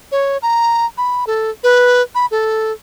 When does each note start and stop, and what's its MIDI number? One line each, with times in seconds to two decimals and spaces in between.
0.12 0.38 73
0.42 0.86 82
0.98 1.25 83
1.27 1.50 69
1.63 2.02 71
2.15 2.26 83
2.31 2.72 69